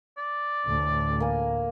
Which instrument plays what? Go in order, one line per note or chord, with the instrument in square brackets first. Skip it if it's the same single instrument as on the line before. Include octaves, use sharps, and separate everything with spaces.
[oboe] D5
[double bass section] A1 D2 A2
[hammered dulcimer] A#3 G#5